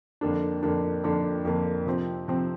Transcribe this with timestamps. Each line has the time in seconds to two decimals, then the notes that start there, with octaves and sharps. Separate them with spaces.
0.21 F2 D3 A#3 D4
0.63 F2 D3 A#3 D4
1.04 F2 D3 A#3 D4
1.45 F2 D3 A#3 D4
1.86 C3 F3 C4
2.28 C3 F3 C4